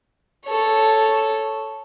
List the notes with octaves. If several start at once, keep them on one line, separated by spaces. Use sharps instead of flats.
A4 C#5